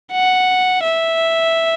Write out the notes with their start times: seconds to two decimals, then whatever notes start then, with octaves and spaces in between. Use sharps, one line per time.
0.12 F#5
0.83 E5